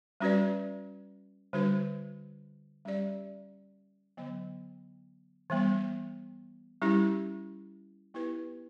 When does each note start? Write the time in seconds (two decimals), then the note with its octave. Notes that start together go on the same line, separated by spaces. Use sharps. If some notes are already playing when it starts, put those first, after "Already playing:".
0.20 G3 C#4 F#4 B4 D5
1.53 D3 G3 D4 F#4 B4
2.85 G3 C#4 G4 D5
4.17 D3 F#3 B3
5.50 E3 G3 B3
6.82 G3 C#4 E4 G4
8.14 B3 E4 G4 B4